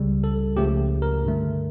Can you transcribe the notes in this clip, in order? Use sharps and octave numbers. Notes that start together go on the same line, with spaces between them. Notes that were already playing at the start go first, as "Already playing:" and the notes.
Already playing: C#2 C#3 G3
A4
C#2 C#3 F3 A3 G4
A#4
G2 D3 A3